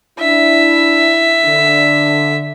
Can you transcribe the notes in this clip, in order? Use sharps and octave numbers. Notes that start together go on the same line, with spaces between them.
D4 E4 E5
D3